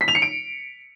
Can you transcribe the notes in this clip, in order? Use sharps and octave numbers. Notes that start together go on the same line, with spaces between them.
B6
F7
C#7
D7